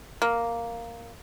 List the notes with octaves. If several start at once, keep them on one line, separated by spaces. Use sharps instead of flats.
A#3